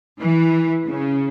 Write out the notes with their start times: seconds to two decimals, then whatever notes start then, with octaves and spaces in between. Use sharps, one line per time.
0.21 E3
0.87 C#3